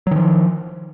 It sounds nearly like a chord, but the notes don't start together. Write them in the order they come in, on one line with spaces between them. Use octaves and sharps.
F#3 D#3 F3